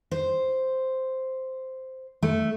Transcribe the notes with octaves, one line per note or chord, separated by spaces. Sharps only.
C5
A3